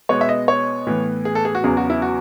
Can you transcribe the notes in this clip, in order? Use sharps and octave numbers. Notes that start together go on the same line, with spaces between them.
B2 G#3 B3 C#5
E5
D#5
C#5
A2 E3 B3
G#4
A4
G#4
F#4
E2 C#3 F#3 B3 G#4
F#4
E4
F#4